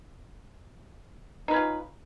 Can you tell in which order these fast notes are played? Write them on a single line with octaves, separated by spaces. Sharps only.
D#4 B4 C#4 F4